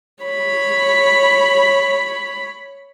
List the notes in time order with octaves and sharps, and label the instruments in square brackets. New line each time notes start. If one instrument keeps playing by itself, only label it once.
[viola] C#5 B5